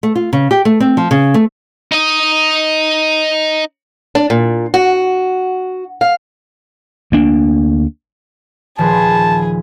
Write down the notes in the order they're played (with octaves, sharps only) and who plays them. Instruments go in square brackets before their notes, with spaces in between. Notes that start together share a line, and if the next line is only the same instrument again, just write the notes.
[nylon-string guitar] A3
F4
C#3
G4
A3
C4
F3
C#3
A3
[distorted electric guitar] D#4 D#5
[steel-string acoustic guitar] D4
A#2
F#4
F5
[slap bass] D2 A#3 D4
[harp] D#1 F3 B4 [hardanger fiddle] G#4 [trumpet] A5